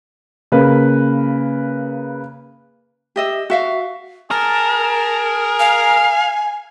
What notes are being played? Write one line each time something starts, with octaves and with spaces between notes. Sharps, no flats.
C#3 A#3 B4
G4 D#5 E5
F#4 E5 F5
G#4 A#4 A5
F5 G#5